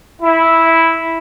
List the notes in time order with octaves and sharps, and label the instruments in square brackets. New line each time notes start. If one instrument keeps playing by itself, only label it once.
[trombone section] E4